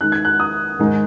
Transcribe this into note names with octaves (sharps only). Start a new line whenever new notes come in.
D#3 G#3 D#4 F#6
G#6
F#6
D#6
G#2 D#3 G#3 D#4